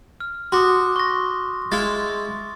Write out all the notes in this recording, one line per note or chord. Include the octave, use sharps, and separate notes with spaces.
F6
F#4 C6 D6 D#6
C#6 A#6
G#3 E4 F5 A6